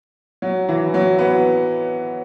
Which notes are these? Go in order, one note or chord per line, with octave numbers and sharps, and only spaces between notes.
F#3
E3
F#3
B3